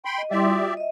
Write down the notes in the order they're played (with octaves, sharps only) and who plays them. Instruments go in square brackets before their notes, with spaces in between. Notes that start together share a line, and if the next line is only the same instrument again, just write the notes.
[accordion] G5 B5 C6
[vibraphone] D#5
[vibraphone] G3 E4 C6 [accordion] G4 D5 E5
[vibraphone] F4 F#4 D#6
D#5 E5